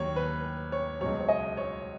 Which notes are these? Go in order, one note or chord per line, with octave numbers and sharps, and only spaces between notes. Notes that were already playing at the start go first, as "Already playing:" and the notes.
Already playing: D#2 D#3 F#3 C#5
B4
C#5
C#2 B2 F#3 C#5
C#5
D#5
C#5